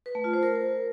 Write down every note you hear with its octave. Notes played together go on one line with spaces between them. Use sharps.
B4
A3
F4
C5
A#4